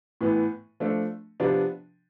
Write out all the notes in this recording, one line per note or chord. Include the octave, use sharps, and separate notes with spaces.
A2 E3 B3
F3 A3 D4
C3 F3 B3 D4